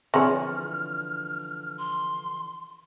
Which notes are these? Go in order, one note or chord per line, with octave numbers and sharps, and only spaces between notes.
D3 E3 F3 C4 G#4 C#5 F6
C6